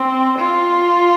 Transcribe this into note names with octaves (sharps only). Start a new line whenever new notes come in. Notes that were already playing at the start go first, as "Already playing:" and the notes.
Already playing: C4
F4